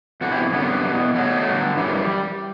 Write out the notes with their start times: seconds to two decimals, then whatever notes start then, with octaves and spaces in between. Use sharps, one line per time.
0.21 E2 C3 E3 F#4 A4
0.32 E4 G4
0.52 F#2 D3 G3 B3
0.84 E2 B2
1.15 E2 B2 F#3 A3
1.46 G2 D3
1.77 F#2 E3 G3